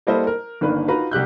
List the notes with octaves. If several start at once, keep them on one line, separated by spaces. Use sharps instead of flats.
G3 A#3 E4 A4 C5 D#5
A#4
G1 D#3 A#3 D4 B4
D#4 F4 F#4 B4 F5 A#5
C2 G4 F#6 G6